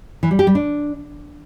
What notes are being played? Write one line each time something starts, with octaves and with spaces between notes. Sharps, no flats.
E3
G3
G4
G3
D4